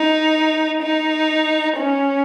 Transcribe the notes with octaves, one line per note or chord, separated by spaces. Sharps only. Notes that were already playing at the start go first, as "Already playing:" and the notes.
Already playing: D#4
D#4
C#4